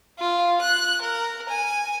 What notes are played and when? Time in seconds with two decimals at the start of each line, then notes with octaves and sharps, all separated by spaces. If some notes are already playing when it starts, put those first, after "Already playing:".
0.19 F4
0.61 F#6
1.01 A#4
1.49 G#5